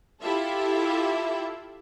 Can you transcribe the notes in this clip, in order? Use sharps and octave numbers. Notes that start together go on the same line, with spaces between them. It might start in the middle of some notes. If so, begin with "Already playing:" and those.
E4 F4 G4 A4 E5